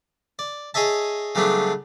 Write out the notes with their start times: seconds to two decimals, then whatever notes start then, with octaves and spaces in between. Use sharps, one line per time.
0.39 D5
0.74 G#4 C#5 D#5 E5 A5
1.35 C#3 F#3 G3 A3 B3 D4